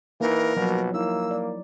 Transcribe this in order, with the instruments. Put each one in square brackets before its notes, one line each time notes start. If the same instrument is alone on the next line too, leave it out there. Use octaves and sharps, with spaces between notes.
[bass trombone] E3 [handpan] A#3 D#4 [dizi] A#4
[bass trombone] B2 [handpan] F3 F#3
[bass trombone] A#3 [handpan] D#4 E4 [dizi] E6
[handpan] D5